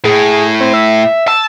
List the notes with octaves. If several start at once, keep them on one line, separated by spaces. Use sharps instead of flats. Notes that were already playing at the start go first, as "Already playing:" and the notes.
A2 G#4
C4
E5
A5 E6